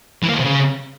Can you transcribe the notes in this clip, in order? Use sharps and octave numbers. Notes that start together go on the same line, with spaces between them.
E3
A#3
D#3
C3
C#3